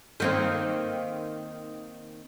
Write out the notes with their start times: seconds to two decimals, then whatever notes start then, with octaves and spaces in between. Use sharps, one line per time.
0.20 D#3 A#3 C4